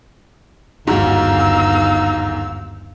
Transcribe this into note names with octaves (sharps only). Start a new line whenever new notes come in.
G1 D#2 G#2 F#3 D#4 F5 E6